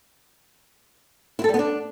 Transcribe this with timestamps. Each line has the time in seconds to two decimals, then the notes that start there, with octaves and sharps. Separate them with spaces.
1.39 E4
1.44 A4
1.49 G3
1.54 B3
1.59 D4